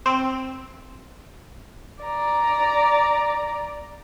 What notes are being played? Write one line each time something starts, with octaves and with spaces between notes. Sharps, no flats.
C4
D5 A#5